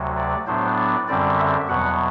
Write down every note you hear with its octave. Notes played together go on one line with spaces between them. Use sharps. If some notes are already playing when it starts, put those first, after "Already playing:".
Already playing: D2 C3 F#3
D5
A2 F#3 B3 D4 C5
D5
F#2 D3 G3 C4 D5
E5
E2 B2 F#3 F#5